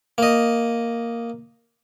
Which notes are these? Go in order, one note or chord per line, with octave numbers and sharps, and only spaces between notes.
A#3 D#5